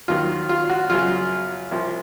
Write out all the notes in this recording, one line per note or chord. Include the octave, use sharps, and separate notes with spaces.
D#2 D#3 F#3 F4
F4
F#4
F#2 C#3 F#3 F4
C2 C3 F3